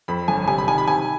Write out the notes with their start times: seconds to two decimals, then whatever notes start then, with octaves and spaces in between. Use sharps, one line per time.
0.08 F2 B5
0.28 G1 G#5
0.48 C3 G#5
0.58 B5
0.68 D#3 G#5
0.78 B5
0.88 C3 G#5